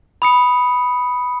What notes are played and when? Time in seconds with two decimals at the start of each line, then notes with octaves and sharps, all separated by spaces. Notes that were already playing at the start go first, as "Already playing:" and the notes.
0.22 B5 D#6 C#7